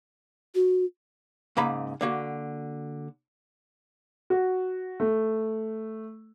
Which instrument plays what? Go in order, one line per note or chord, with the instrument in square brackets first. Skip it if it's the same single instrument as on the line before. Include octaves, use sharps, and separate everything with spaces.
[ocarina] F#4
[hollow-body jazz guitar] G#2 C#3 A#3 A#5 B5
D3 A#3 F#4
[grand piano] F#4
A3